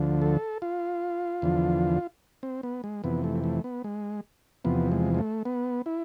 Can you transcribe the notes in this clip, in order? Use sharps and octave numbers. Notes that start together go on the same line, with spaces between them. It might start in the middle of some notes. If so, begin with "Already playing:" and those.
Already playing: D2 D3 F3
A4
F4
E2 D3 F3
C4
B3
G#3
F2 C3 E3 B3
A3
A3
B3
G#3
E2 C3 F3 B3
G#3
G#3
A3
B3
E4